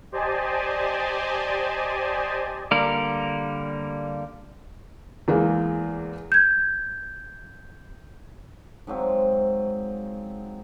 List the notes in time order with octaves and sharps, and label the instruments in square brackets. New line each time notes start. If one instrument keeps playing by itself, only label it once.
[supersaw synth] G4 C5 D5 D#5 G#5 A5
[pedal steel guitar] D3 G3 A#3 A#4
[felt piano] E2 E3 G#3 A#3
[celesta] G6 G#6
[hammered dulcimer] G#2 F3 F#3 C4